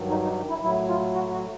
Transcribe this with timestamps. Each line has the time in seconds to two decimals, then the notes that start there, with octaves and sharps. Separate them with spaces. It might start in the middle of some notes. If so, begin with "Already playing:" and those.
Already playing: G2 D#3 F#3
0.10 D#4
0.23 D#4
0.49 E4
0.63 A2 F#3 E4
0.89 F4
1.15 F#4
1.32 F#4